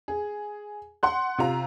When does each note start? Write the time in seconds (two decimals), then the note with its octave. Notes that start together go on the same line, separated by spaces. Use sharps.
0.08 G#4
1.03 F#5 C6 F#6
1.38 C3 F4 A#5